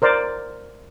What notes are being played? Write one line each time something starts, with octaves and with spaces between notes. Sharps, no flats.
A#4 C5 D5